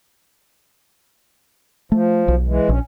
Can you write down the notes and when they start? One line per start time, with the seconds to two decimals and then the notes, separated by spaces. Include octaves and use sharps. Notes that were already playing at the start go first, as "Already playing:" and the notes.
1.92 F3 A3
2.28 B1
2.47 E3 G#3
2.69 A#1 C#4